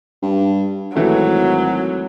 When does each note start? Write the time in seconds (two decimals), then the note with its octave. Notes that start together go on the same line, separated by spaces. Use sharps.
0.22 G2
0.95 G#1 E3 F#3 A3